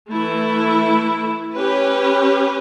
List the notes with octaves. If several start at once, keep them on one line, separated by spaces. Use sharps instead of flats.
E3 A3 E4
C#4 G4 B4